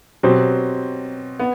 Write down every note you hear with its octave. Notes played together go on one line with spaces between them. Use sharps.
B2 F#3 C4 G4 C5
B3